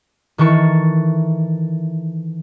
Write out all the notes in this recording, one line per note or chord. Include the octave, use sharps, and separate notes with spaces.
D#3 E3 A4 C#6